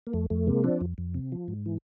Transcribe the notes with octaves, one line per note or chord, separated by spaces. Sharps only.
A#3
F2 A3
F2 A3
C3 G#3 A#3
F3 C4 D4
F2
F2
C3
F3
G#2
E3